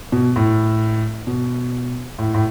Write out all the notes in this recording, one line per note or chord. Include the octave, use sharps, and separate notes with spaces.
B2
A2
B2
A2
A2